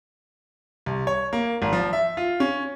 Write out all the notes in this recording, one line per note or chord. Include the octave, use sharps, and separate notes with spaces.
C2
C#5
A#3
G#1
F3
E5
F4
C#4